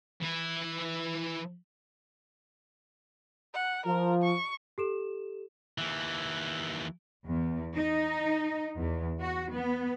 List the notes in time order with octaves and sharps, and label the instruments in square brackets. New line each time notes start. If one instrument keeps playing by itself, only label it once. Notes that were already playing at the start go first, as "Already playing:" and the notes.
[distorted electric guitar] E3 E4
[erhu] F#5
[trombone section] F3 [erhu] A#4
[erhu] C#6
[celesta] G4 A4 E7
[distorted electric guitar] D#2 E3
[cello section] E2
D#4
E2
F#4
B3